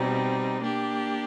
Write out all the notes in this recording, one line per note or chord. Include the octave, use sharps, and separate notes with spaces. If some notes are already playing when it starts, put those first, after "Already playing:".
Already playing: B2 G3 C4 D#4
A#3 D4 G4